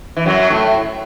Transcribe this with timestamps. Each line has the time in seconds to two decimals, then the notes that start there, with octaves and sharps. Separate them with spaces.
0.17 E3
0.26 F#2 F#3
0.50 A2 A3